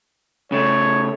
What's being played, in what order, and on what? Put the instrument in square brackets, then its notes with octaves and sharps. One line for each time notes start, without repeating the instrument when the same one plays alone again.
[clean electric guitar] C#3 A3 [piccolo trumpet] C#5